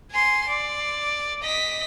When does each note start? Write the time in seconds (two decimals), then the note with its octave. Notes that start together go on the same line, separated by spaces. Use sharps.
0.12 G#5 C6
0.48 D5
1.43 D#5 B6